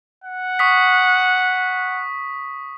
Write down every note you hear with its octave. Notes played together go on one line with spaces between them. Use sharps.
F#5
C#6 D#6 B6